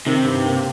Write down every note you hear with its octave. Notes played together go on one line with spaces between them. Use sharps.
C3 D#3
G2
A#3